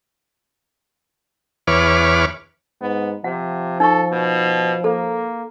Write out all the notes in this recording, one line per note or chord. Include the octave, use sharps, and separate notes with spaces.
E2 B4 C#5 D6 F6
G#2 B3
C3 F3 F#5
D#4 A4 C#6
B2
A#3 A4